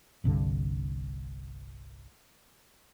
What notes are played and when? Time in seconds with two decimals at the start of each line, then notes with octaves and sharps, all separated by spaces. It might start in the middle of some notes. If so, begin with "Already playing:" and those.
0.24 G1 C2 G2 D3